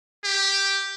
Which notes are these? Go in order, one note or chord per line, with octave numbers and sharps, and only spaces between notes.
G4